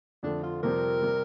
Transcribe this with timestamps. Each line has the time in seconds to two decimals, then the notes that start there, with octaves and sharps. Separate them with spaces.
0.23 F2 D3 A3 D4
0.43 F4
0.63 F2 C3 G3 C4 G4 A#4
1.02 C3 G3